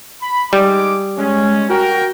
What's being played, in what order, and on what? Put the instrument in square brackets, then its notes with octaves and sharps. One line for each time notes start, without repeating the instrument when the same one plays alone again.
[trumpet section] B5
[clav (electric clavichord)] G3 [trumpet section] G#3 D#4 D6
[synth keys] G#3 [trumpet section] C#4
[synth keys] F#4 [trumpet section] A#4 G5